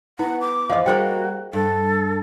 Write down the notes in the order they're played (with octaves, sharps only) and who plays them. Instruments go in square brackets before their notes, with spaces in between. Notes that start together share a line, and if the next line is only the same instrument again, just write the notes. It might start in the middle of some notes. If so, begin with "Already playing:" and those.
[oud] B3 [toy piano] E4 [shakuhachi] F#5
[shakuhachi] D6
[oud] E2 F3 [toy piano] D#5 F5
[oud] G3 A#3 A#4 [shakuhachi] F#4 [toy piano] G#4 C5 G5
[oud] G2 [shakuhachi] A4